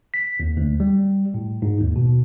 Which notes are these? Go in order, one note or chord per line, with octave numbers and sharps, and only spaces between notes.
B6
D#2
D2
G3
A2
G#2
D#2
B2